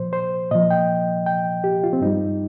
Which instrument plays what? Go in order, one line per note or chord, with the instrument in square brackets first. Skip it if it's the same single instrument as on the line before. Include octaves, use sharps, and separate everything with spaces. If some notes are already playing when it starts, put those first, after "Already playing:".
Already playing: [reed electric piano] A#2 F3 C5
C5
A#2 F3 D#5
G5
G5
G4
F4
C4
G2 G3 D#4